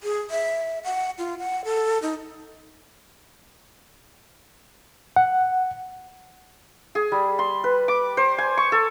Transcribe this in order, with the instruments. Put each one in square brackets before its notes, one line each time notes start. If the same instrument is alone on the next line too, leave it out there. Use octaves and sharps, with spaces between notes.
[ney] G#4
E5
F#5
F4
F#5
A4
D#4
[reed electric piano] F#5
[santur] G#4
G3
C6
B4
D6
C5
G#5
C#6
A4